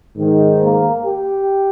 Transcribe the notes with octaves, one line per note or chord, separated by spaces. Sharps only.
G#2 D#3
A#3
G4